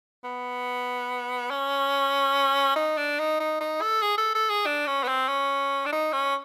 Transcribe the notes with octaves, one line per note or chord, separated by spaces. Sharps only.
B3
C#4
D#4
D4
D#4
D#4
D#4
A4
G#4
A4
A4
G#4
D4
C#4
B3
C4
C#4
D4
D#4
C#4